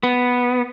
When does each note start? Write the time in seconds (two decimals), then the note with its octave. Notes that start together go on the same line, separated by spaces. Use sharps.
0.03 B3